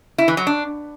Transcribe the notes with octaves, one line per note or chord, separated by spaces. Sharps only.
E4
E3
F#3
D4